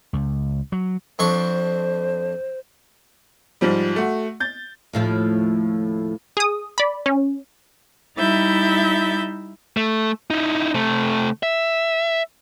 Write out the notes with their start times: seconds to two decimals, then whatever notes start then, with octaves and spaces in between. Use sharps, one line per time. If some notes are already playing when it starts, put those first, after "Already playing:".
0.13 C#2
0.72 F#3
1.19 F2 D4 C5 C#6
3.61 G#2 F3 G3
3.96 A3 F#4
4.40 G6 A6
4.93 D#2 A2 F3
6.37 G#4 D#6
6.78 D5 B5
7.06 C#4
8.18 G3 D#4 E4 E5 G6 A6
9.77 A3
10.31 D#4 E4
10.74 C3 A3
11.43 E5